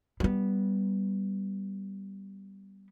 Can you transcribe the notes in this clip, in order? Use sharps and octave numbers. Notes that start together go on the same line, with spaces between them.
G3 B3